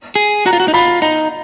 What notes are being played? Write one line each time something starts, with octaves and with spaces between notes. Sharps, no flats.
G#4
F#4 A#5
F4
F#4
D#4
F4 B5
D#4 A#5